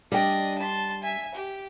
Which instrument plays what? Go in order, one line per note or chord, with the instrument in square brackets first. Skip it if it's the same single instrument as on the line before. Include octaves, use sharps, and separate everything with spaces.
[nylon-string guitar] G3 G5 [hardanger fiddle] D4 D#5
[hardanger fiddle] A5 C6
E5 G#5
G4